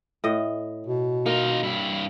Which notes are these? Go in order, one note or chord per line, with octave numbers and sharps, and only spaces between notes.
A2 D#5
B2
A#3 D#4 F4
G2 E4